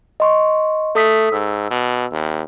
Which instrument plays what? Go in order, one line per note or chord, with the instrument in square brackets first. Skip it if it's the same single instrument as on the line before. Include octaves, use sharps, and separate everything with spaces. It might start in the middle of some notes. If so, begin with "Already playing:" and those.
[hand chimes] D#5 C6 C#6
[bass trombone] A3 [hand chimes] A4 D#6 B6
[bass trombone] G#2 [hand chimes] E6
[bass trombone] B2
D#2